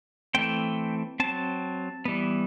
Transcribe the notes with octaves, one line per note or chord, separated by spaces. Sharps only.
E3 A3 C4 G5
F#3 C4 A5
E3 G3 B3